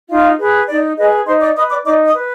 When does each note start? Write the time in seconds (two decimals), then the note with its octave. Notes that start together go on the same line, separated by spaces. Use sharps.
0.09 D#4 F4 F5
0.38 G#4 B4
0.68 D#4 D5
0.97 G#4 B4 D#5
1.27 D#4 C5 C6
1.41 D5 D6
1.56 B4 D#5 D#6
1.70 D5 D6
1.85 D#4 D5 D6
2.05 D#5 D#6
2.15 B4